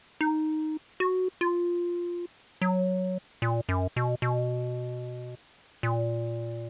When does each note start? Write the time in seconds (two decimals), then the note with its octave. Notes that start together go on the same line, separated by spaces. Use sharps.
0.21 D#4
1.00 F#4
1.41 F4
2.62 F#3
3.42 A#2
3.69 F#2
3.96 B2
4.22 B2
5.83 A#2